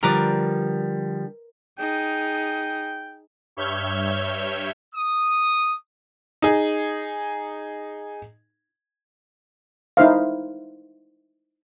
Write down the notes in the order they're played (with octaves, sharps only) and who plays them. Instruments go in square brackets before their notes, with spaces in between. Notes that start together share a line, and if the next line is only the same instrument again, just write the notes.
[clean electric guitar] D3 F3 G3 [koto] A#4 B4 D5
[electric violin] D#4 G#4 [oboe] G5
[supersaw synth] G2 C#5 E5 F6 G6 G#6
[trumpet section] D#6
[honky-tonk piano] D#4 G#4
[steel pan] D#4 E4 C5 F5